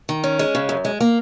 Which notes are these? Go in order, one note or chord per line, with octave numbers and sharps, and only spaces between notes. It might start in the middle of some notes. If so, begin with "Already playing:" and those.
D#3
C#4
G#3
C#3
F#2
G#3
A#3